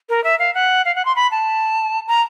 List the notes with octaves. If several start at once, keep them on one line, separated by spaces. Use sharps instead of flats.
A#4
E5
F5
F#5
F5
F#5
C6
B5
A5
A#5